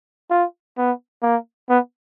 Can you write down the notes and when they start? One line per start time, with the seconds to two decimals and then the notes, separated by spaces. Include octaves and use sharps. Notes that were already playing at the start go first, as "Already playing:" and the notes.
0.30 F4
0.78 B3
1.22 A#3
1.69 B3